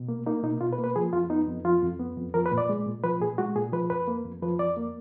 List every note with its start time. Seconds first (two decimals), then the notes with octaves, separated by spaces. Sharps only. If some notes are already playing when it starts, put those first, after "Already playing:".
Already playing: B2
0.08 A#3
0.26 A#3 D#4
0.43 B2 D#4
0.61 B2 F4
0.73 B4
0.78 A#3
0.84 B4
0.96 F3 G#4
1.13 F2 F4
1.30 B3 D#4
1.47 F2
1.65 F3 F4
1.82 F2
1.99 B3
2.17 F2
2.34 F3 A#4
2.46 B4
2.52 A#2
2.58 D5
2.69 G#3
2.86 A#2
3.04 F3 B4
3.20 A#2 G#4
3.38 G#3 F#4
3.56 A#2 G#4
3.73 F3 B4
3.90 F2 B4
4.08 A#3
4.25 F2
4.42 F3 B4
4.59 F2 D5
4.77 A#3